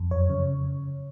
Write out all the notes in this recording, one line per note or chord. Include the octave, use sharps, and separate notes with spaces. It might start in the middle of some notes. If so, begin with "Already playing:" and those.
Already playing: F2
F#2 C#5
C#3